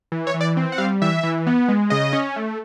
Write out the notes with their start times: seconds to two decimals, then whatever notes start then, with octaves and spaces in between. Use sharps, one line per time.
0.12 E3
0.27 C#5
0.34 E3
0.41 D5
0.57 C4
0.72 F#5
0.78 G3 F5
1.02 E3 E5
1.23 E3
1.47 B3
1.68 G#3
1.90 C#3 D#5
2.13 C#4
2.36 A3